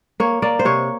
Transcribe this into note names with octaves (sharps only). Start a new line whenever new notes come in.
A#3 C#5
A#3 D5
C5
C3 C#5